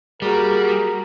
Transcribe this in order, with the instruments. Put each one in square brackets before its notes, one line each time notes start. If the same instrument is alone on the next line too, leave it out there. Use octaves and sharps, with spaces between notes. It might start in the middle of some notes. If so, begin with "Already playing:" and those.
[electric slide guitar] G3 [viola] A#3 F#4 [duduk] G#4 [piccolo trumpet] A#4